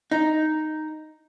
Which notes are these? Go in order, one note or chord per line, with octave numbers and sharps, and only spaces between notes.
D#4